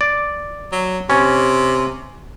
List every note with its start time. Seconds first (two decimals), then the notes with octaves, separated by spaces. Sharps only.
0.01 D5
0.72 F#3
1.10 C3 C#4